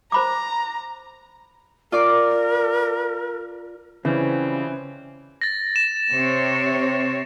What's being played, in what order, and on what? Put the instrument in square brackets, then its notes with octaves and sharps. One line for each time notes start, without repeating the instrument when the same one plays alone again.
[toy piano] C5 B5 D6 [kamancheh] A#5
[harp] F4 D5 D6 [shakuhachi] A#4
[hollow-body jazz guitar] C#3 [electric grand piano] E3 C#4 [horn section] F3 G3 C4
[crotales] A6 A#6
E7
[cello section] C3 C4 C#5